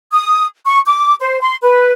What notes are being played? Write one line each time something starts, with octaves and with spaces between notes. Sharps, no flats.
D#6
C#6
D6
C5
C6
B4